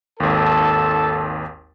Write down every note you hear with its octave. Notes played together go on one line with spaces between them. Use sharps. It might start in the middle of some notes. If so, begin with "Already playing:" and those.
G#1 D#2 A4 A5